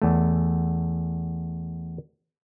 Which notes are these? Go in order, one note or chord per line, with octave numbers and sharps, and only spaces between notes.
E2 A3